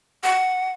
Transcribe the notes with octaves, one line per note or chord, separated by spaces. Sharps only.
F#5